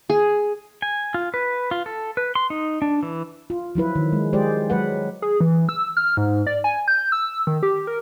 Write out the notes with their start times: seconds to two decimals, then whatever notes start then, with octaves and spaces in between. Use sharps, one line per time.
0.09 G#4
0.82 G#5
1.14 F4
1.34 B4
1.71 F4
1.86 A4
2.17 B4
2.35 C6
2.50 D#4
2.82 D4
3.03 E3
3.50 F4
3.75 F3 F#3 E4 B4
3.96 D#3
4.13 G#3
4.33 F#3 G#3 G4 G#4 C5 D5
4.70 F#3 G#3 B4 F#5
5.22 G#4
5.41 E3
5.69 E6
5.97 F6
6.17 G#2
6.47 D5
6.64 G#5
6.88 G6
7.12 E6
7.47 D#3
7.63 G4
7.87 A#4